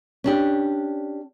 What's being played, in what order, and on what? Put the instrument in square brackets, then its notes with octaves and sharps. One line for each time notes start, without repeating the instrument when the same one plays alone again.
[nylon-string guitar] C#4 D4 G4